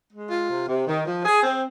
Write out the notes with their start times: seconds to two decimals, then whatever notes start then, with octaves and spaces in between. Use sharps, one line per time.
0.12 G#3
0.30 F4
0.49 C3
0.68 C3
0.87 D#3
1.06 F3
1.25 G#4
1.43 C4